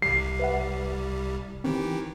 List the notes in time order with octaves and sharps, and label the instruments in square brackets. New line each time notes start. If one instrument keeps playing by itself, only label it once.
[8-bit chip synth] C2 G3 [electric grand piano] C7
[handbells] B4 E5 F#5
[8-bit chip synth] D#3 E3 G4 [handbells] C4